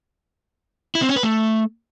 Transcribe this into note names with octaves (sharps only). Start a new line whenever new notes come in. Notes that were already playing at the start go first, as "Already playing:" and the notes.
E4
C4
C#4
B4
A3